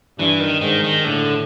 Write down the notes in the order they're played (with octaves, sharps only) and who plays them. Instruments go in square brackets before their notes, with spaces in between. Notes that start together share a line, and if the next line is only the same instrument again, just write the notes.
[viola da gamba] G2 [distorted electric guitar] E3
[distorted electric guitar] D#3
[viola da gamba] G#2 [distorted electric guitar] D#3
[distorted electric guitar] D#3
[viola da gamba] A2 [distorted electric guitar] D3